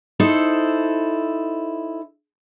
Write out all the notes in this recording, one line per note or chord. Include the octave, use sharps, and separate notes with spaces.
D#4 E4 A4 C5